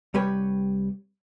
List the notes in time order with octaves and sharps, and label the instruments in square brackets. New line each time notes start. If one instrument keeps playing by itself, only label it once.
[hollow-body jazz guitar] C2 G3 G4 B4 C#5